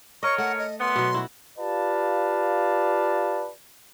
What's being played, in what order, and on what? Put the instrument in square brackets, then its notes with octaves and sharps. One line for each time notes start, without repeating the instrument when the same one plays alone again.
[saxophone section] A#4 C#5 [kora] D#5 [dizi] C#6
[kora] A3 [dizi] F#5
[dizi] D#5
[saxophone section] F#2 B3 [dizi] C6
[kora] B2 F#3
E4 F#4
[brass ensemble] F4 G4 B4 D5 F5 A5